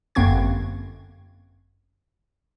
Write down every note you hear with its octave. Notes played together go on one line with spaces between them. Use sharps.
G1 F#2 A#3 C4 C#6 G#6